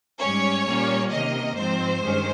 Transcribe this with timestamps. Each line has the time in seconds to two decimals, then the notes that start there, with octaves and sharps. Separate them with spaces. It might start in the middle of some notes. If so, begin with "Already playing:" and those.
0.20 G#2 G3 C#4 C#5
0.66 A#2 G3 A#3 C#4
1.11 C3 D#3 A#3 D#5
1.57 G#2 F3 C4 C5
2.01 G2 D#3 G#3 C#4